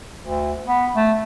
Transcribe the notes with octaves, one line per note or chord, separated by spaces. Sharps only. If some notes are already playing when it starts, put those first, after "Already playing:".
D2
B3
A3